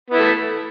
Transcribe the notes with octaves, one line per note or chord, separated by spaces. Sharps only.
A3 B3 E4